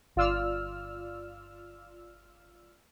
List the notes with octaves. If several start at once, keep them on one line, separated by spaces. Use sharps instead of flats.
G1 F4 D5 E6 F6